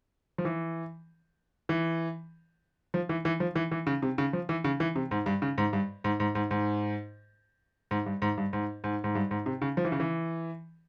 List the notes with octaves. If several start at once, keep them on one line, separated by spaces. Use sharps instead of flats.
F3
E3
E3
F3
E3
E3
F3
E3
E3
C#3
C3
C#3
F3
E3
C#3
E3
C3
G#2
G2
C#3
G#2
G2
G#2
G#2
G#2
G#2
G#2
G2
G#2
G2
G#2
G#2
G#2
G2
G#2
C3
C#3
F3
E3
C#3
E3